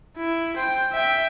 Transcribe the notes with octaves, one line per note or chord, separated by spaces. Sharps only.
E4
C5 G5
E5 G5